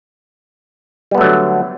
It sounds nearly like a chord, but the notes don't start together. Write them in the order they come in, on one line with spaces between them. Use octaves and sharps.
G3 B3 A3 F#3 D3